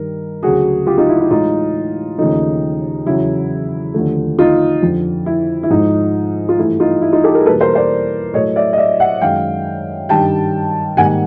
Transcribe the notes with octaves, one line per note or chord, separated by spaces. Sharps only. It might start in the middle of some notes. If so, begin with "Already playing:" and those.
Already playing: G2 D#3 G3 A#4
D2 C#3 F#3 A3 F#4 G#4
F4 G4
D#4 F4
E4
E4
A2 E3 G#3 D#4 F4
D#2 C#3 F3 A3 D#4
E2 C#3 F#3 E4
D#2 D3 F3 A3
D#4 F4
F2 D3 F3
E4
E4
G#2 F3 G#3 D#4
F4
G2 E3 A3 E4
D#4 F4
E4
D#4 F4
G4 A4
G#4 A#4
E2 B2 G3 A#3 A4 B4
A#4 C5
C5 D5
A2 F#3 A3 C#5 D#5
D5 E5
D#5
D5 E5
E5 F#5
F#2 D#3 G#3 F5 G5
G2 D#3 G3 G5 A5
G#2 D#3 G3 A#3 F#5 G#5